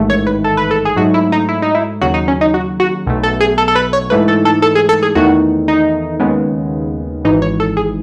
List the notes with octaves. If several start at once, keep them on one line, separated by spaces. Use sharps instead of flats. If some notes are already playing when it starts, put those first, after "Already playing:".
Already playing: A1 G#2 D#3 A3
C#5
B4
A4
B4
A4
G#4
G#2 F#3 A3 F#4
E4
D#4
E4
D#4
E4
D#2 C#3 F#3 F#4
D#4
C#4
D#4
F#4
F#4
B1 B2 A3
A4
G#4
A4
A4
B4
C#5
G#2 E3 A3 B4
A4
A4
A4
G#4
A4
G#4
E2 D#3 A3 F#4
D#4
D#2 C#3 G#3 B3
G#1 G#2 E3 D#4
C#5
A4
G#4